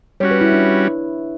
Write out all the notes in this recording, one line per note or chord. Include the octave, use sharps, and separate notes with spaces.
G3 C#4 F#4 C#5
B4
E4
D4